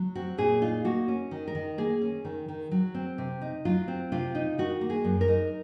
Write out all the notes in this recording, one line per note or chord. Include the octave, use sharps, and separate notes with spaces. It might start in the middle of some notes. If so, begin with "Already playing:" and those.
Already playing: F#3
C4 F#4
A#2 G#4
D#4 F4
A#3 F#4
C#4
D#3
A#4
D#3
A#3 G#4
C#4
D#3
D#3
F#3
C4
C3
D#4
F#3 F4
C4
C3 F4
D#4
D#3 F#4
A#3
G#4
F#2
A#4
D#4